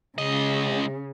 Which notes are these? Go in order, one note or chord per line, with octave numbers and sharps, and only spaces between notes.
C#2 C#3 D#5